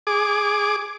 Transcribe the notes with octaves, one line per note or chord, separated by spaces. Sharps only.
G#4 D6